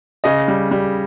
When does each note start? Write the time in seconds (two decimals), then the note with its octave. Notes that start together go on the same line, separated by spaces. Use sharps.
0.24 C#3 D#5
0.48 G3
0.71 G3